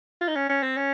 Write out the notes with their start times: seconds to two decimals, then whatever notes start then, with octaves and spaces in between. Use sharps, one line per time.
0.21 F4
0.28 D#4
0.36 C#4
0.50 C#4
0.63 C4
0.77 C#4